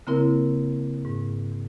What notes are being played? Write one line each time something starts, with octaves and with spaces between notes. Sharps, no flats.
C#3 A#3 C4 E4 A#4
G#2